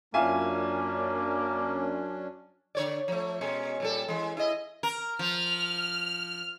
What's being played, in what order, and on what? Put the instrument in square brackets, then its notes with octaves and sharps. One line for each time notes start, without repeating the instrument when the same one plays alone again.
[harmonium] F#2 C#4 D4 [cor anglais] A#3 [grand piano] F4 E5 G#5
[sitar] D3 C#5 D5
F3 A3
B2 G#3 C#4
A#2 G3 A4
E3 G#3
E4 D#5
A#4
[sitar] F3 [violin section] F6